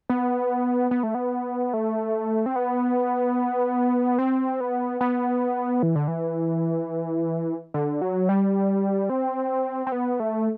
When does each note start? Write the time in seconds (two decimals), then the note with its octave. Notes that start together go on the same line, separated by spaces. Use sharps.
0.10 B3
0.91 B3
1.03 A3
1.15 B3
1.74 A3
2.46 C4
2.56 B3
4.18 C4
4.60 B3
5.01 B3
5.83 E3
5.95 D3
6.08 E3
7.74 D3
8.02 F#3
8.29 G3
9.10 C4
9.87 C4
9.92 B3
10.20 A3